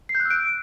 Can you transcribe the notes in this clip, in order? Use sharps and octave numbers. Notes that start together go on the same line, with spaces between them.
C7
G6
F#6
E6
D7